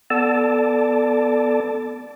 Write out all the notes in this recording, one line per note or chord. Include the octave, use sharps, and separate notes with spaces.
B3 A4 D5 A5